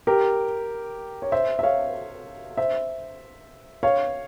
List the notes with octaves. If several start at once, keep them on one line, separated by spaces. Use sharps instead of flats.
G4 A#4
C#5
C5 E5
E5
C#5 F5
C5 E5
C#5 F5